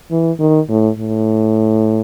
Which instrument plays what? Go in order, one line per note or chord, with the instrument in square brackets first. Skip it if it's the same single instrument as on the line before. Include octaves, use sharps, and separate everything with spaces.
[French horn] E3
D#3
A2
A2